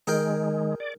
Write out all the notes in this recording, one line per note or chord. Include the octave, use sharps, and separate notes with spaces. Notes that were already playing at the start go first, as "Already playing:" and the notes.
D#3 G#3 G#4 A#4 G5
D5